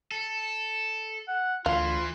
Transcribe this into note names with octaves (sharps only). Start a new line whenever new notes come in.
A4
F#5
D2 E3 F4 F5